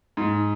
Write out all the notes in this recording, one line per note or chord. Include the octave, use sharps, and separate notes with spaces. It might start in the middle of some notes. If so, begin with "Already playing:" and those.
G#2